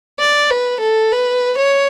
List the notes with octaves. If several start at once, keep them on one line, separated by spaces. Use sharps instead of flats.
D5
B4
A4
B4
C#5